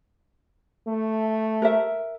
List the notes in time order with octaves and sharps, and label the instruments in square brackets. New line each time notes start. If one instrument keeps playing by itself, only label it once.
[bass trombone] A3
[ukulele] A#4 E5